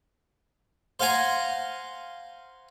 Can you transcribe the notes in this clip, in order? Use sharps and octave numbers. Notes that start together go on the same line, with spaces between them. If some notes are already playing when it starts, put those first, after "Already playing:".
C5 F5 F#5 G#5 A#5